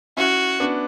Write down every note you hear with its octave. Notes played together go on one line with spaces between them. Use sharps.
C#4 E4 F#4
B3 D4